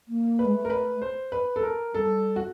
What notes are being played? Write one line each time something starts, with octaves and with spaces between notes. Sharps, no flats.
A#3
B4
G#3
A3
A#4
B4
C5
B4
A4
A#4
G3 A4
F#4